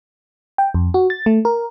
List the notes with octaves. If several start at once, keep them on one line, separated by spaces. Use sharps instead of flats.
G5
F2
F#4
A6
A3
A#4